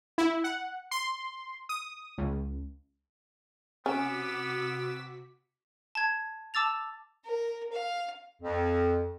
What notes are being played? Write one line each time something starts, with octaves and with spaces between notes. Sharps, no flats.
E4
F#5
C6
D#6
C#2
C3 B3 C#4 F#4 D6 E6 B6
A5 G#6
A5 D6 E6 A6 F7
A#4
F5
F2